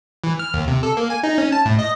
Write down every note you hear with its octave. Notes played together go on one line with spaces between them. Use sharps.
E3
F6
D#2
C3
A4
A#3
G#5
D#4
C#4
A5
A2
D#5